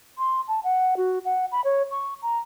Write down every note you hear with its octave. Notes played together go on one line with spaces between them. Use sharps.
C6
A5
F#5
F#4
F#5
B5
C#5
C#6
A#5